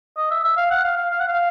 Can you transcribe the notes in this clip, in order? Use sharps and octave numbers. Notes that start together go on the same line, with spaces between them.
D#5
E5
E5
F5
F#5
F5
F5
F5
F#5
F5